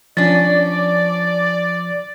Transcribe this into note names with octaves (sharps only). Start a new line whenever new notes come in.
F3 C#4 D4 D5 A6